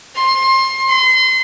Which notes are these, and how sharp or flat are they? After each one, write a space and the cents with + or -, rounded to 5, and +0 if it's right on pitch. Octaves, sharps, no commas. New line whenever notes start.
C6 +25
C6 -30